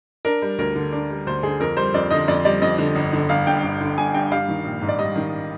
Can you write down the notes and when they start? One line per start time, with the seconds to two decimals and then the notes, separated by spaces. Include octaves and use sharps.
0.25 D4 A#4
0.42 G3
0.58 D2 A#4
0.75 D3
0.92 D4
1.10 G3
1.26 D2 C5
1.43 D3 G#4
1.60 F2 A#4
1.77 G3 C5
1.94 F2 D5
2.11 D3 D#5
2.28 F2 D5
2.45 G3 D5
2.62 F2 D#5
2.78 D3
2.96 G1
3.13 D3
3.29 G1 F5
3.47 G2 G5
3.64 G1
3.81 D3
3.98 G1 G#5
4.14 G2 G5
4.31 G3 F5
4.49 D#3
4.65 A#1
4.81 G#2
4.89 D5
4.98 G3 D#5
5.16 D#3